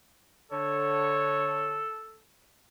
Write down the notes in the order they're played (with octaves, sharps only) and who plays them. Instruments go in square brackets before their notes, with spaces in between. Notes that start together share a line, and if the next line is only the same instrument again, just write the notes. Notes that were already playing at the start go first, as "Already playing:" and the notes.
[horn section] D3 C#5 [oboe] A4